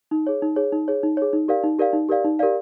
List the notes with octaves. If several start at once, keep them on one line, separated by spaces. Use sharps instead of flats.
D#4
G#4 C#5
D#4
G#4 C#5
D#4
G#4 C#5
D#4
G#4 C#5
D#4
G4 A#4 D5 F5
D#4
G4 A#4 D5 F5
D#4
G4 A#4 D5 F5
D#4
G4 A#4 D5 F5